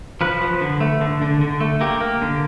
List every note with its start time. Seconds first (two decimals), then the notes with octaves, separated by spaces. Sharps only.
0.21 F3 B4
0.41 F3
0.61 D3
0.80 A3
1.01 D3
1.22 D3
1.41 D3
1.60 A3
1.80 A#3 G4
2.00 A#3
2.22 D3